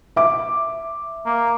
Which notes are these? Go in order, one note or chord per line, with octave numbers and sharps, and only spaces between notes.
E5 D6
A#3